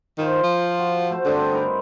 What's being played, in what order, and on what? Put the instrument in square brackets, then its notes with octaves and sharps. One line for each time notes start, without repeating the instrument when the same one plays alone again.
[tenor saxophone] D#3 [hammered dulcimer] F4 C5 F5
[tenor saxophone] F3
[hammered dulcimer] F#4
A3 C5
[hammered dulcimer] G2 C4 D4 [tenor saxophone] D3
[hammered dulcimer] D#4 E4 A#4